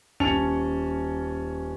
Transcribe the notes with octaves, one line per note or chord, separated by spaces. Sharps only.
D#1 C#4 A5 C#7 F7